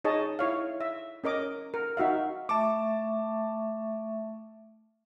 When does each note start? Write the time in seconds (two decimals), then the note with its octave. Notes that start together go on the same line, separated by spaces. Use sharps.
0.04 D#4 G#4 C#5 D#5 A5
0.39 E4 C#5 F5
0.81 E5
1.24 C#4 A#4 D#5 D6
1.74 A#4
1.97 D#4 F#4 E5 F5
2.49 A3 E5 A5 C#6 D6